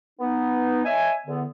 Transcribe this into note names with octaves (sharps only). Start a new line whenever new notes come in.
B3 D#4
C#5 D#5 E5 G#5
E2 D3 B3